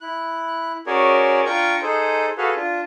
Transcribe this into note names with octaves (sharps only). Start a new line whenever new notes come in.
E4 F#6
C#4 F#4 G#4 A#4 C#5 D5
D4 F4 G5 A#5 C#6 F6
D#4 G#4 A4 C5
F#4 G#4 A4 B4 F5
D4 F4